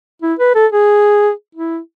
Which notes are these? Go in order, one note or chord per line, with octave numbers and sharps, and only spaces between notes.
E4
B4
A4
G#4
E4